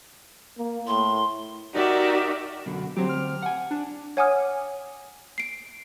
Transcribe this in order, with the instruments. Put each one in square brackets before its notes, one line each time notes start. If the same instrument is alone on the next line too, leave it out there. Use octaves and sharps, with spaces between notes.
[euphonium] A#3
[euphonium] A2 [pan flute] C6
[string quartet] D#4 F#4 G4 A#4 D5 E5
[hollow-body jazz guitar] F#2 B2 D3
[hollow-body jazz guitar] D2 C4 G4 [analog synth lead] F#3
[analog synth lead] F6
[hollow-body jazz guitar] F#5 G#5
[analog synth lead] D4
[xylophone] C#5 F#5 G#5 D6 D#6 F6
C7 D7